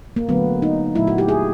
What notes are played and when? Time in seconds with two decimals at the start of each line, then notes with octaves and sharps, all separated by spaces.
0.16 A#3
0.29 D3 F#3 A3 B3
0.62 D#4
0.95 A#2 F#3 A3 E4
1.07 F#4
1.18 G4
1.28 G#4